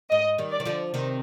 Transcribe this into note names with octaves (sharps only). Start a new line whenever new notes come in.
G#2 D#5
D#3 G3
D5
D#3
D3 F3
C3 D#3